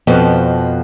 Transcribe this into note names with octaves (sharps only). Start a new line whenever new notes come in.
F2 B2 F3 B3